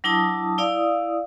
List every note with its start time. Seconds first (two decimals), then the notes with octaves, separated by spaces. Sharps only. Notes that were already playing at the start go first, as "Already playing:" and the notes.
0.04 F#3 D4 E4 A5 D#6
0.58 E4 D5 F5 D#6